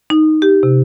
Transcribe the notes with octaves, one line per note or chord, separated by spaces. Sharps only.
D#4
G4
C3